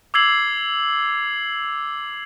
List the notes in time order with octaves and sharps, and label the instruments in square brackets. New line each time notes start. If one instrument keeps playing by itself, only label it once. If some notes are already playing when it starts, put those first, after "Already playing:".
[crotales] D6 E6 G#6 C7 F#7